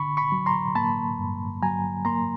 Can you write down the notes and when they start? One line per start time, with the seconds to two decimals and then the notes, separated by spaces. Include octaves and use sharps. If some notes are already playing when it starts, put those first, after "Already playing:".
Already playing: D3 B5 C#6
0.17 B5 C#6
0.32 F#3
0.46 A#5 C6
0.75 A#3 A5 B5
1.18 G2
1.62 F#3 G#5 A#5
2.05 A#3 A#5 C6